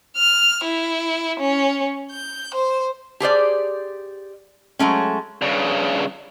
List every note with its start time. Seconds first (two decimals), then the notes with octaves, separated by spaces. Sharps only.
0.17 F6
0.64 E4
1.39 C#4
2.11 G6
2.54 C5
3.20 G4 G#4 C5 D5
4.79 F#3 G#3 A3 C#4
5.42 G2 C#3